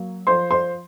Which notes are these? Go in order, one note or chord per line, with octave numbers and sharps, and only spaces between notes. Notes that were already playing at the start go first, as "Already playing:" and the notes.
Already playing: F#3 A#3
F3 C5 C6
C5 C6